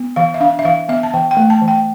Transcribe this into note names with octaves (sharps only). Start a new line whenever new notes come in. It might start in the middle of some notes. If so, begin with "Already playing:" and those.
Already playing: B3
E3 F5
E5
D4 F5
E5
E3 F5
B3 E5
A5
E3 G5
G5
A3
A5
E3
G5